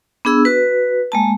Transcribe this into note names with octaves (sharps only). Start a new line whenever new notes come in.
B3 D4 G#4 E6
F#4 B4
G#3 A#3 A5